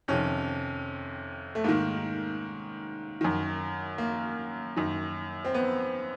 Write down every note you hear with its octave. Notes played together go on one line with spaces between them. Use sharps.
F2 C3 D#3 C#4
A3
G#2 D#3 A#3
F#2 D#3
A#3
F#2 D#3
C4
B3